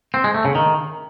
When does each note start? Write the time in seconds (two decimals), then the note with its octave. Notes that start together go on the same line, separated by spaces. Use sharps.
0.14 C4
0.24 G#3
0.34 A3
0.45 C#3
0.55 D#3